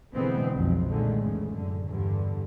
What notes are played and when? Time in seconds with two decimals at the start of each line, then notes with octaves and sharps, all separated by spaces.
0.14 B2 D3 E3 G#3 B3 C4
0.54 B1 F2 C4
0.89 A#2 D3 D#3 G#3 A3
1.22 E2 A2 C#3
1.52 F#2 D3
1.88 E2 G2 D3